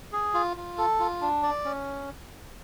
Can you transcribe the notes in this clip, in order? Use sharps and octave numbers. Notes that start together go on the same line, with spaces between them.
G#4
F4
F4
A4
F4
D4
D5
C#4